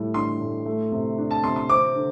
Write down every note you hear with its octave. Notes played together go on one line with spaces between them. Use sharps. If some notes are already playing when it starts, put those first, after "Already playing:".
Already playing: A2 G3
D4 C6
A2
A3
C3
D4
A5
C3 C6
C6
C4 D6
D3